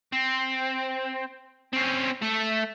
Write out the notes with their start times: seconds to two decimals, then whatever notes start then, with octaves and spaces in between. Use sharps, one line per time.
0.13 C4
1.73 C4 C#4
2.22 A3 A4